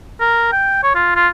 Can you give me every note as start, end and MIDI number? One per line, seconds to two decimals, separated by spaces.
0.20 0.47 70
0.52 0.79 79
0.83 0.91 73
0.95 1.14 65
1.16 1.28 65